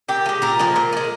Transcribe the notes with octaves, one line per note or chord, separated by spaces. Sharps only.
A#2 G4
F3
G#3
A#2 A#4
F3 G#3
A#2
F3
G#3